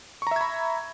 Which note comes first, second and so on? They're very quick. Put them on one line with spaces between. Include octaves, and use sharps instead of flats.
C#6 A#5 E5 G#6 B5